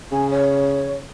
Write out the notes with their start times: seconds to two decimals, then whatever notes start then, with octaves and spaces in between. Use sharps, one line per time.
0.12 C#3 G#5
0.30 C#5